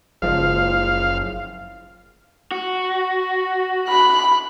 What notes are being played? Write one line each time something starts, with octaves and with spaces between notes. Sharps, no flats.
F#1 F3 G#3 F5
F#4
B5 F#6